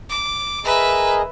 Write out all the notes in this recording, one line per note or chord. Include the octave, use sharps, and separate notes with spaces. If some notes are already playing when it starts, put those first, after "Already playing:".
D6
G#4 A#4 B4 D#5 E5